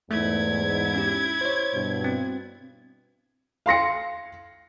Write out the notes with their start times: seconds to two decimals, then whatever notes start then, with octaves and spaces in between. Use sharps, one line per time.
0.11 E2 G#2 A3 E4 G#6
0.95 C#4 G4
1.41 C5 C#5
1.74 G2 B2
2.04 C4
3.66 F5 C6 A#6 C#7